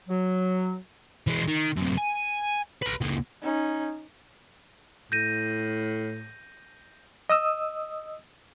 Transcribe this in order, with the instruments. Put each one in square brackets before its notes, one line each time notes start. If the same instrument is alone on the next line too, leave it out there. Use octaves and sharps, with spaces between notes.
[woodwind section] F#3
[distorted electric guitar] E3 G#3
D#3
F#2 C3
G#5
B4 A#5
C#2 A#3
[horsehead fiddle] C#4 D#4
[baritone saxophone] A2 [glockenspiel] G6 A#6 D#7
[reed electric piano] D#5 D#6 E6